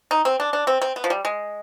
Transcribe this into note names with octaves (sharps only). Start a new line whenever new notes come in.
D#4
C4
D4
D4
C4
C4
B3
F3
G3
G#3